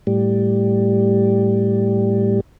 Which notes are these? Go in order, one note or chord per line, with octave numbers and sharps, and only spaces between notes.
A2 G3